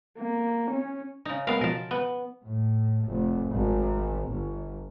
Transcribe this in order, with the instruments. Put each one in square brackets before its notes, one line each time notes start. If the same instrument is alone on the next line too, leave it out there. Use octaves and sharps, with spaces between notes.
[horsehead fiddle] A#3
C#4
[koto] C#3 D#4
[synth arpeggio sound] G#3 B3 A#4 [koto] F5
[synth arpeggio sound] B2 F3 [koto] A#4 A5
[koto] B3
[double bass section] A2
F1
G#1
G1